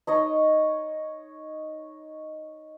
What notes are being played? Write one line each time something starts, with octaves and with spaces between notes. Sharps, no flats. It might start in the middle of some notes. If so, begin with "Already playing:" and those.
D#4 C#5 D#5